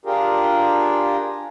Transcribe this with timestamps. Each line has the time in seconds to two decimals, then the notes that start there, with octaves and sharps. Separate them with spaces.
0.05 D4 F4 G4 G#4 A#4